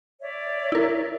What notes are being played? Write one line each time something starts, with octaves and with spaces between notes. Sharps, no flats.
C#5 D5 E5
E4 A#4